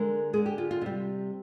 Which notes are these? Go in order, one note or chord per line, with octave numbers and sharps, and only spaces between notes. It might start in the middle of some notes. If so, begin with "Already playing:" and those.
Already playing: D3 G#3 A#4
D3 G#3 G#4
G4
F4
F4
C3 G3